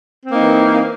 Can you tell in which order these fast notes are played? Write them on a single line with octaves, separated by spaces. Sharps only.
C4 A#3 D#4 E3